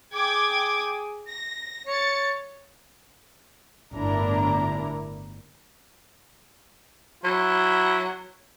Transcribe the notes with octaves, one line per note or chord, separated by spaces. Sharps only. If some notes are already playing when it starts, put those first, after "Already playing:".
G#4 G5 D6 G#6
A#6
C#5 A6 C#7
G1 A2 D4 E4 A#4 A#5
F#3 E4